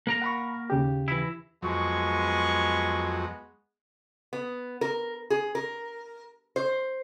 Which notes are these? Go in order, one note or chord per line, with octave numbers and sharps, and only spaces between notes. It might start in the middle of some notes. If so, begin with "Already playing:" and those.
A#3 A#4 A#5
F#5 B5 C#6
D#2 C#3 G4
E3 E4
F2 F#3 G#3 B3 C#6
B3
A#4
G#4
A#4
C5